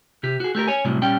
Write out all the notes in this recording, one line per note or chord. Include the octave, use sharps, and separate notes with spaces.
C3 G4
F#4 G#4
A3 G4 A4 A#4
C#5 G#5
C2 A2 C3 F#3
A#2 G3 C#4 G5